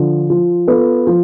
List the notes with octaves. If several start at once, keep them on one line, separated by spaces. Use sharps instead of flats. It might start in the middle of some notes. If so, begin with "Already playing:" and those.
Already playing: D3 F3
F3
B3 F4 A4
F3